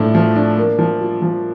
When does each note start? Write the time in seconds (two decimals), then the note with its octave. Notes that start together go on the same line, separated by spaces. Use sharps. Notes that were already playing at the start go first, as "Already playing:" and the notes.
Already playing: A2 F3 A3 D4
0.15 F3
0.36 D4
0.58 A#3
0.79 F3
1.00 F4
1.22 F3